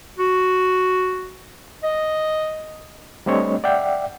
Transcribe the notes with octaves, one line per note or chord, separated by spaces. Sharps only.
F#4
D#5
G3 A3 C4 D4 C#5 D#5
D5 E5 F#5 G5